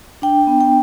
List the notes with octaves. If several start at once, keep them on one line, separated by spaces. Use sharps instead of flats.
D4 G5
B3
G5